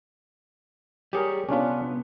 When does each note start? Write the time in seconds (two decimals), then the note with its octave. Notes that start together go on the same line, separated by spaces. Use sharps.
1.13 G3 G4 G#4 A#4 C#5
1.49 C2 B3 C#4 D4 F4